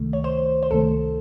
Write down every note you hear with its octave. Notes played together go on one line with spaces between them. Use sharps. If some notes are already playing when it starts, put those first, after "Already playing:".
Already playing: C#2 C3 D#3 A3
C#5
C5
C5
C#2 C3 D#3 A3 A4